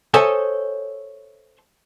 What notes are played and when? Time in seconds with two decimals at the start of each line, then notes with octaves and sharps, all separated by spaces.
0.14 A4 C5 C#5 D#5 E5 G#5